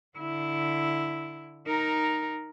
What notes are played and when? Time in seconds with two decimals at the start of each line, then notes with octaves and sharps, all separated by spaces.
0.18 D3 E4
1.67 D#4 A#4